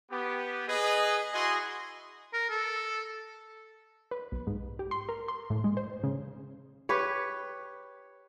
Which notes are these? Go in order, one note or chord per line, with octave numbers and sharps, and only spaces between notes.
B3 G4
G#4 B4 D#5
E4 F#4 G#4 D#5 G#5 C6
A#4
A4
B4
B1
G#2
G4
C6
A#4
C6
A2
G#3
C5
C#3
G4 B4 C#5